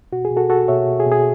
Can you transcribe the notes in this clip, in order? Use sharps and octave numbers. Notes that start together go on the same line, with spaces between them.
B2 F#4
G#4
B2
F#4 A4
B2 F#4 A4
B2 C#5 E5
B2
G#4
B2
G#4